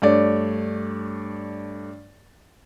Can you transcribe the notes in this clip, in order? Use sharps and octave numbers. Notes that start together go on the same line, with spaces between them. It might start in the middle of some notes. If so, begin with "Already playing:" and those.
G2 A3 C#5 D5